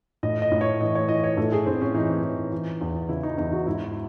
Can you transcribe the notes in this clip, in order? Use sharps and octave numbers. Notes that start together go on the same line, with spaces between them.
A2 D#5
D#5
A2
C#5
E3 D#5
C#5
E3 D#5
C#5
A2 A4
G#4
A2 C4
C#4
E3 D#4
E3
E3
E2
C#3 E4
D#4
E2 D#4
F#4
G#2 E4